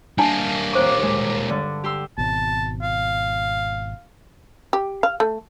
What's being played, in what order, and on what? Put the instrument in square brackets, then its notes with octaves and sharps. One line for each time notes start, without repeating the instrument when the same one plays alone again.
[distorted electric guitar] G3 A#3 [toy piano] D4 G#5 A5
[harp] D#2 D6 [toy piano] C5 C#6
[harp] G#3
G2 D3
G4 C6 E6
[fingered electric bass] G#1 B2 [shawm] A5
[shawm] F5
[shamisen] G4
F5
A3